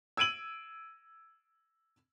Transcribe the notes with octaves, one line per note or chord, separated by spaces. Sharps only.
E6 G#6 D7 D#7 F#7